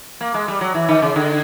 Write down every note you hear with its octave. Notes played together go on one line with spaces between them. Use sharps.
A#3
G#3
G3
F#3
E3
D#3
C#3
D3